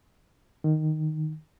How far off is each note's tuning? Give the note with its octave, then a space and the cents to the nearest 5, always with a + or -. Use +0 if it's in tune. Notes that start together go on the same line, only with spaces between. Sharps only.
D#3 -5